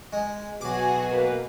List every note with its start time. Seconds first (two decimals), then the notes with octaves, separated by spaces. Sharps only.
0.13 G#3
0.61 B2 F#3 F#4 G#4 D6
1.10 A#3 B4